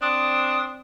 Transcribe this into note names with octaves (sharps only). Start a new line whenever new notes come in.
C4 D4 D#6